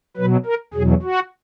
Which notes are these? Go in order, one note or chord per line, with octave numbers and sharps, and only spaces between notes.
B2 F#3 B4
A#4
E2 B2 F#3 G#4
F#4